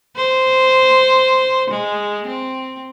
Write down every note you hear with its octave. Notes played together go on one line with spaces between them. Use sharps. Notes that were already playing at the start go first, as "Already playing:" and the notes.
C5
G#3
C4